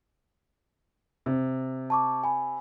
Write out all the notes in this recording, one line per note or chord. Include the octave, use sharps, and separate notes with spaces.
C3
A5 C#6 D6
G#5 B5